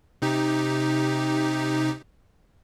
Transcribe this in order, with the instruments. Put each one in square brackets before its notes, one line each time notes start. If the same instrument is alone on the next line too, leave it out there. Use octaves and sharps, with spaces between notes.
[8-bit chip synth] C3 D#4 G4